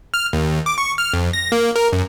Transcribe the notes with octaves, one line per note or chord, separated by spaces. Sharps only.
F6
D#2
D6
C#6
F6
F2
A#6
A#3
A#4
F#2